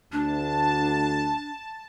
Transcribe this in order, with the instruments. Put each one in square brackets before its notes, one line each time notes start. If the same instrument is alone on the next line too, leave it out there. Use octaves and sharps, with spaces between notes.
[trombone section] D2 [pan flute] D4 [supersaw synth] A5